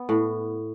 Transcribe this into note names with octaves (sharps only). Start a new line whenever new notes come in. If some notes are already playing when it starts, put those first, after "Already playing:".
Already playing: B3
A2